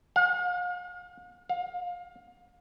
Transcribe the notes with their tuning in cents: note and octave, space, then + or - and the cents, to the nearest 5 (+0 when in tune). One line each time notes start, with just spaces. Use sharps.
F5 +40
F5 +25